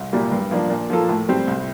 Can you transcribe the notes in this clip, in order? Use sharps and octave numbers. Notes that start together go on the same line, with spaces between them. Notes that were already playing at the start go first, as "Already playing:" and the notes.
Already playing: C2
A#2 G3 A#3
G2
F3 A#3 D4
A#2
F3 A#3 F4 A4
A2
G3 C4
C2